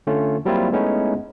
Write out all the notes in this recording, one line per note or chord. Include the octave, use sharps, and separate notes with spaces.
D3 A3 C#4 F4
F#3 G3 A#3 C4 E4 F4
G#3 A3 B3 C#4 D#4 E4